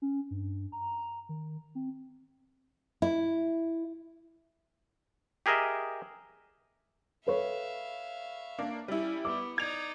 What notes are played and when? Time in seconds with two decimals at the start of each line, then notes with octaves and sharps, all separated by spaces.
0.02 C#4
0.31 G2
0.72 A#5
1.29 D#3
1.75 C4
3.02 E4
5.46 G4 G#4 A#4 D#5 E5
7.27 A4 B4 C#5 E5 F5
8.59 A#3 D4 A#4
8.88 G3 C#4 E4
9.25 B3 D6
9.58 D#4 D5 G#6 F7